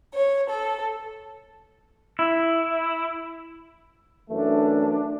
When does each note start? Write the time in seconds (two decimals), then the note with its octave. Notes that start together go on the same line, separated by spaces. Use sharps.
0.13 C#5
0.50 A4
2.19 E4
4.29 F#2 E3 A3 D4